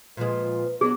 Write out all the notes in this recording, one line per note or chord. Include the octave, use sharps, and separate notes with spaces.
A#2 F3 G#3 B4
F#3 B3 D4 G#4